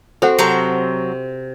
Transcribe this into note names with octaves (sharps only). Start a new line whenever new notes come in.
C4 F#4 A4 A#4 C5 F#5
C3 F#3 C4 A#4 A5 A#5